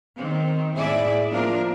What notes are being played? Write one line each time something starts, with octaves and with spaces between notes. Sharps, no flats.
D#3 C4
A2 E4 G#4 D5 E5
F3 A#3 C4 D4 F4 A#4